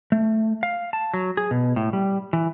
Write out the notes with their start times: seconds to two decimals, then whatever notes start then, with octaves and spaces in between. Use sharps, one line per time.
0.12 A3
0.63 F5
0.93 A5
1.14 F#3
1.37 G#4
1.51 B2
1.76 A2
1.93 G3
2.33 E3